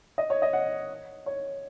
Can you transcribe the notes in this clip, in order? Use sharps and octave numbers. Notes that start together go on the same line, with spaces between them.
D#5
C#5
D#5
F#5
C#5